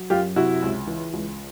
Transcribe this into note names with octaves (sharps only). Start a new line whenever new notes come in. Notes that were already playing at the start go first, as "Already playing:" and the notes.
Already playing: F#3
F#2 F4 G4
C3 E4 F#4
C#2
E3
C#2